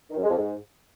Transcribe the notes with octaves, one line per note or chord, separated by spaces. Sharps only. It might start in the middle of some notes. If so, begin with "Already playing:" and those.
D#3
F#2
G#3
F2
G#2